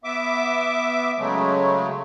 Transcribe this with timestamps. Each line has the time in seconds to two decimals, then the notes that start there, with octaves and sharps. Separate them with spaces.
0.04 B3 E5 D6
1.18 C#3 F#3 G#3 A3